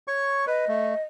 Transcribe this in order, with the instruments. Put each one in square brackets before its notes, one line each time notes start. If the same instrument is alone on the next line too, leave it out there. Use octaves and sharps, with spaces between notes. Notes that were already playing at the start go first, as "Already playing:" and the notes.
[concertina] C#5 C#6
[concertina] B4 [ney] D#5
[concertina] A3